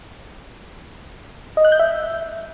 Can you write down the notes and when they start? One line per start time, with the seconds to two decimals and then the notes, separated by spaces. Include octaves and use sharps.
1.57 D#5
1.65 F#6
1.72 G6
1.79 E5